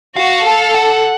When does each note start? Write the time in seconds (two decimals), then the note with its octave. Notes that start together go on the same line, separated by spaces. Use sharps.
0.16 F#4 F5
0.45 A4
0.74 F#5